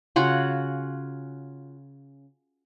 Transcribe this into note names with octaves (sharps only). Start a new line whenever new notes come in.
C#3 F4 F#4 F#5